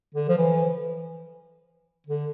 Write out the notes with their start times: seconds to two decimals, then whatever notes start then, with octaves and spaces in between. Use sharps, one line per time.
0.15 D3
0.29 F3
0.38 E3
2.07 D3